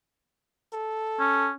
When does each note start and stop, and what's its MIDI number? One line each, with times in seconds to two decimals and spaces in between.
0.73 1.50 69
1.20 1.52 61